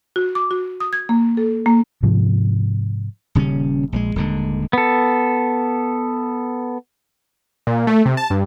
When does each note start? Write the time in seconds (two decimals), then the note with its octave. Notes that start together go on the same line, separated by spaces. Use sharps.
0.16 F#4
0.35 D6
0.51 F#4
0.80 D#6
0.93 G#6
1.09 A#3
1.37 A4
1.66 A#3
2.03 G#2 C3 F3
3.35 D#1 C#3 G3 C#4
3.92 A#1 F#3 G#3
4.16 D#1 D3 G#3
4.73 B3 A4
7.67 A#2
7.87 A3
8.06 C3
8.17 A5
8.30 G2